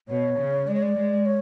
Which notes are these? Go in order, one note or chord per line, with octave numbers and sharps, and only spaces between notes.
B2 C#5
C#3
G#3 D5
C#5
D5
G#3
C#5